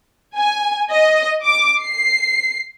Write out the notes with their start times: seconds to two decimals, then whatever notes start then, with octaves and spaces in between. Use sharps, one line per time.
0.36 G#5
0.91 D#5
1.45 D6
1.81 C7